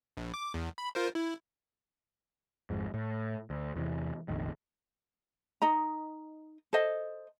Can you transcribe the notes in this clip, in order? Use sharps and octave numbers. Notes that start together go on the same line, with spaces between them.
A#1
D6
E2
B5
F4 A#4 C5
E4
G#1 F2 G#2
A2
D2
E2 C3 E3
F1 A#1 F2 D#3
D#4 D#5 A#5
A4 C5 D#5